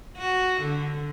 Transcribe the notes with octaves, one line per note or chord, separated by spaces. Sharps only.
F#4
D3